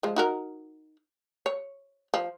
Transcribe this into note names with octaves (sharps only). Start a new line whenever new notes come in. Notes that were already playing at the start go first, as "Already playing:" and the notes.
F3 G#3
D#4 F#4 A#4
C#5
F3